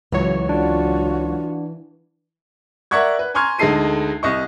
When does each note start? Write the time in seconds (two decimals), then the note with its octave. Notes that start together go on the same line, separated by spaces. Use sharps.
0.12 C#2 E3 F#3 C#5
0.49 D4 F4 F#4
2.91 A#4 D5 E5 F#5 C#6 G#6
3.19 B4
3.35 G#5 A#5 C6 C#6 F6 G#6
3.59 D2 G#3 D#4 A4 C7 D#7
4.23 C2 D#5 C#6